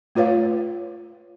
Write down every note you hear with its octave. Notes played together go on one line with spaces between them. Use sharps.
A3 F4 B4 C#5 F5